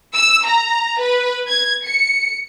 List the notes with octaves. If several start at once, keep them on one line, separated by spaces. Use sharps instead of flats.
E6
A#5
B4
G#6
C#7